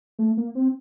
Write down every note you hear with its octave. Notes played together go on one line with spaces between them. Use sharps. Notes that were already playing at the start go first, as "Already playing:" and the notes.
A3
A#3
C4